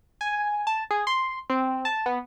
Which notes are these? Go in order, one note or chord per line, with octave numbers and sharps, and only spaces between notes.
G#5
A5
G#4
C6
C4
A5
B3